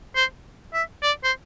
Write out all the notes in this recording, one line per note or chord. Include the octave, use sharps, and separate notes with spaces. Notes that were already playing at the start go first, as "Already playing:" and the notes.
C5
E5
D5
C5